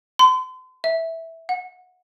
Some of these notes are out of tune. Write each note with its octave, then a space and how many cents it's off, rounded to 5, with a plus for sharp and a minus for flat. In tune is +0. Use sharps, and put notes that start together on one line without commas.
C6 -40
E5 -5
F#5 -25